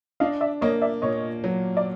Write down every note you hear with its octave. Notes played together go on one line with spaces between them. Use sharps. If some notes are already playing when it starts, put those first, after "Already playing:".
D4 D#5 F5
D5 E5
A#3 C#5 D#5
D5 E5
A#2 C#5 D#5
F#3
D5